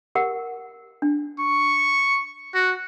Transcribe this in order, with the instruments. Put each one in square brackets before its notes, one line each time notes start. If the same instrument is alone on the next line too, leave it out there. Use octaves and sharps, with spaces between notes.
[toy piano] G4 A#4 F#5
D4
[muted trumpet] C#6
F#4